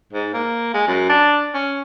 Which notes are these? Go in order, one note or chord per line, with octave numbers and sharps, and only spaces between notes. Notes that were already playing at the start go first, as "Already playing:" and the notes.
G#2
A#3
G#3
F#2
D4
C#4